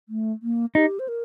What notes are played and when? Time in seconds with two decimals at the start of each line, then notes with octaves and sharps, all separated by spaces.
0.09 A3
0.43 A#3
0.75 D#4 G4
0.99 C5
1.08 A#4